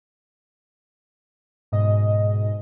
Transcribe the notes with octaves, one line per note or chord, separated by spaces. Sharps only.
G#2 B2 D#5